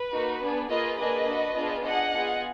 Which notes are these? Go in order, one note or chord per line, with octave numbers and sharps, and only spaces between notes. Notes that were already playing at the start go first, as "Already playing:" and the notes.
Already playing: B4
A#3 D#4 F#4
B3 D4 G#4
A#3 F4 G#4 B4 D#5
A#3 D4 G#4 B4 D#5
D4 F#4
B3 D4 F4 G#4
D4 G#4 D#5 F#5
B3 F4 G#4